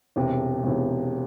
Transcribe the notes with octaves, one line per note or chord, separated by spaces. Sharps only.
E1 E2 C3
E1 E2 C3